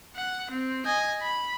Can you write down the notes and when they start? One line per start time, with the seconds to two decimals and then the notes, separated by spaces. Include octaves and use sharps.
0.15 F#5
0.51 C4
0.85 D#5 G#5
1.22 B5